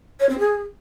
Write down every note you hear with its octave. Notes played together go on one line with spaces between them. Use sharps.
C#5
C4
G#4